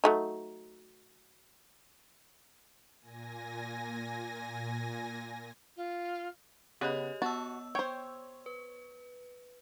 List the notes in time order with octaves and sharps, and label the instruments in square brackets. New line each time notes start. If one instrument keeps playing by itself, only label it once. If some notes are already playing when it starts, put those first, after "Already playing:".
[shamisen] F#3 A3 D#4
[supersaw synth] A#2 G#5 A#6
[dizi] F4
[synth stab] C#3 B3 B4 [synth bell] G4 C#5 D#5 [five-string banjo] G#4
[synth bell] B3 E6 [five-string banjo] F#4 [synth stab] A5
[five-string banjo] C5 G5 [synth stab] C#5
[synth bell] B4